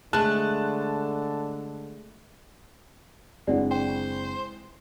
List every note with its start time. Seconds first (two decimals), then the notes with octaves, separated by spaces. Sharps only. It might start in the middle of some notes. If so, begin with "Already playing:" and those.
0.13 D3 G#3 A3 A5 F#6
3.47 F#1 E3 G#3 C4 D4 D5 F#5
3.71 C5 G5